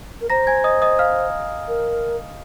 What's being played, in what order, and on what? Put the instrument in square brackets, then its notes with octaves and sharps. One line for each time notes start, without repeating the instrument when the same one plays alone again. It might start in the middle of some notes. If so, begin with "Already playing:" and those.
[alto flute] A#4
[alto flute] C5 [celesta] A#5 A#6
[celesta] G#5 G#6
D#5 D#6
D#5 D#6
F5 F6
[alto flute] A#4